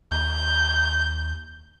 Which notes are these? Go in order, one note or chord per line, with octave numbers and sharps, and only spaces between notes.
D#2 G6